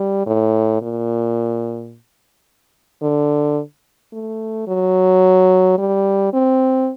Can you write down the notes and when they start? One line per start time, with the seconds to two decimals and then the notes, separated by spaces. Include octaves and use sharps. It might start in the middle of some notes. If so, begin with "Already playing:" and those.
Already playing: G3
0.27 A2
0.82 A#2
3.03 D3
4.13 A3
4.68 F#3
5.78 G3
6.33 C4